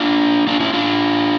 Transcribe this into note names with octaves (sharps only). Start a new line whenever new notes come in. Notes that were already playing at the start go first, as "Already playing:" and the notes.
Already playing: D4 F4
D4 F4
C#4 E4
D4 F4